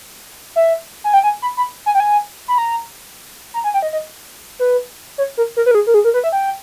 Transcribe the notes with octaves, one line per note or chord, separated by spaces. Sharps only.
E5
G#5
G5
G#5
B5
B5
G#5
G5
G#5
B5
A#5
A#5
G#5
G5
D#5
D#5
B4
C#5
A#4
A#4
B4
A#4
G#4
A#4
G#4
A#4
B4
E5
G5